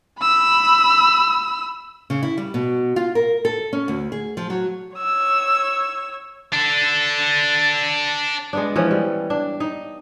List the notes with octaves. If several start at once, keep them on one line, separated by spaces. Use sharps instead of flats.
B5 E6
C#3
E4
G3
B2
F4
A#4
A4
C#4
D2
G#4
F3
F#3
C#5 E6
D4 A4
G#3 B3 D4
E3 F3 C#4
G3
D4
D#4